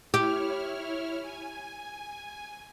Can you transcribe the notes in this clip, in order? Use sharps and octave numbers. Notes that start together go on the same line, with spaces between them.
E4 G4 C#5 F6
G#5